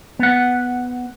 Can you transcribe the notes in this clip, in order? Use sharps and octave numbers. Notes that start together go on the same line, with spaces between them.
B3 F#5